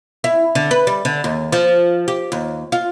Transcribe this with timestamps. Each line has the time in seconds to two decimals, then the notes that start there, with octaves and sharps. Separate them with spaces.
0.24 E4
0.55 D3
0.71 B4
0.87 G3
1.05 D3
1.24 D#2
1.52 F3
2.08 G4
2.32 D#2
2.72 F4